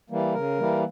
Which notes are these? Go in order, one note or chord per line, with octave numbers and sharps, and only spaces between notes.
E3 G3 A#3
C#3 A#4
E3 G3 A#3